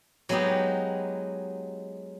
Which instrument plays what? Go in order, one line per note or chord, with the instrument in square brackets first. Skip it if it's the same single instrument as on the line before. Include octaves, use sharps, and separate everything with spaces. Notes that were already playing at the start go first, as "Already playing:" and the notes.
[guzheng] F#3 G#3 B3 D#4 G4